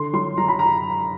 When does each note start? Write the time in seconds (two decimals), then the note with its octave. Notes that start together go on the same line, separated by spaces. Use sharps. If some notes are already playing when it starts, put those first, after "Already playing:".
Already playing: D3 C6
0.13 F#3 C6
0.37 F#3 A#5
0.48 B5
0.59 A#5